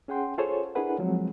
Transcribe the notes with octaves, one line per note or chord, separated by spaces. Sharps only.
C#4 G#4 F#5 G5 C6
F4 G#4 A4 C5 C#5
D4 E4 G#4 A#4 B4 F#5
F3 F#3 G#3 C4